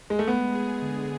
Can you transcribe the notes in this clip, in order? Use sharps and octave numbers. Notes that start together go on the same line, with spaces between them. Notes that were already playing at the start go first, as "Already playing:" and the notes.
G#3
A3
G#3 B3
G#4
D3